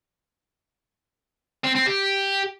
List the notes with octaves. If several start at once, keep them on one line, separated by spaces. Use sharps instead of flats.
C4
C4
G4